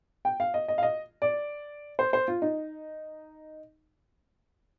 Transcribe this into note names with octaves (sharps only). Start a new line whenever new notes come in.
G5
F5
D#5
D#5
F5
D#5
D5
C5
C5
F4
D#4